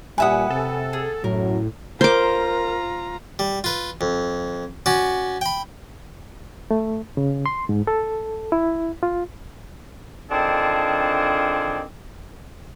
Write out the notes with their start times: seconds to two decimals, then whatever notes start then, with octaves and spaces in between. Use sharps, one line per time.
0.18 A#2 G3 B4 E5 F#5 G#5 D#6
0.50 C3 A4
0.93 G#4
1.24 F#2 A2 F#3 A#4
2.01 F4 A#4 C5 A#5 D6
3.39 G3
3.64 F4 B4
4.01 F2
4.86 C#4 F#4 D5
5.41 G5 B5
6.71 A3
7.17 C#3
7.46 C6
7.69 G#2
7.87 A4
8.52 E4
9.03 F4
10.30 D3 D#3 C4 D4 F4 G#4